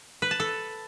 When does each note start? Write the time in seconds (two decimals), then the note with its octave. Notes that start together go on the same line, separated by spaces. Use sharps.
0.22 B4
0.31 A5
0.40 A4